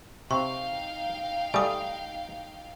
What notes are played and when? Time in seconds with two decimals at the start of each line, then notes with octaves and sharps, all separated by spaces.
0.31 C3 D#4 F5 G5 C#6
1.54 G3 A3 G#5 D#6